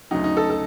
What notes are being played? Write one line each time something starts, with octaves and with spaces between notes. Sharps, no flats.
D2 C#3 F#3 D#4
D#4
A4
A4